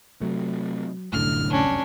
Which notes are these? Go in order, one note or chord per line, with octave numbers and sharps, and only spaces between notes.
C3 F#3 A3
F1 C2 F#2 A2 D3 F6
C#4 D4